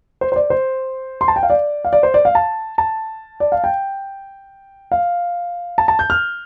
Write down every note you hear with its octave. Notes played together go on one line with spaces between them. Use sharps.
C5
C5
D5
C5
C6
A5
G5
F5
D5
F5
D5
C5
D5
F5
A5
A5
D5
F5
G5
F5
A5
A5
G6
F6